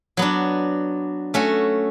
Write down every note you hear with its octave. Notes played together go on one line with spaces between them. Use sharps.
F#3 B3 D4
A3 C#4 F#4